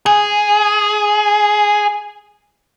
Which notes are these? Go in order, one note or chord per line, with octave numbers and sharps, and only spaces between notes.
G#4 G#5